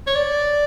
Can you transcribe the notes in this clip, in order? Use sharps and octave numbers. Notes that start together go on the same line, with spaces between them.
C#5
D5